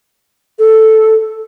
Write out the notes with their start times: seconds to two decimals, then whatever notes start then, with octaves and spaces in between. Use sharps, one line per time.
0.59 A4